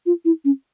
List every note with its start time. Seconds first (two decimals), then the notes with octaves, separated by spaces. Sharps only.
0.06 F4
0.25 E4
0.45 C#4